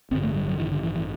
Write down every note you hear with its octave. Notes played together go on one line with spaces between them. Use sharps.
A1 G2 D3 C4
A3
G3
F#3
E3
D3
E3
E3